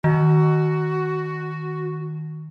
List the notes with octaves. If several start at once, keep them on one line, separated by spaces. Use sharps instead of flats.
D#3 F#4